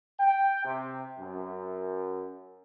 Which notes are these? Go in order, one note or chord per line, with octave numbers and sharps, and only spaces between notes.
G5
C3
F#2